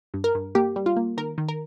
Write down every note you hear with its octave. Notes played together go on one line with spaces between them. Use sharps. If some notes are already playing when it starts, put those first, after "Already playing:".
G2
A#4
G2
A#3 G4
G3
F4
A#3
D#3 A#4
D#3
A#4